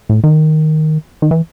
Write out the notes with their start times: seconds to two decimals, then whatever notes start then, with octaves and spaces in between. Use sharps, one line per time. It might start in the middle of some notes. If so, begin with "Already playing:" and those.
0.09 A2
0.24 D#3
1.22 D#3
1.31 E3